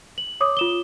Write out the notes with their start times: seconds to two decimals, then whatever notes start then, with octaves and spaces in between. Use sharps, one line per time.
0.18 F#7
0.41 C#5 D6 D#6
0.57 F4 E7 G7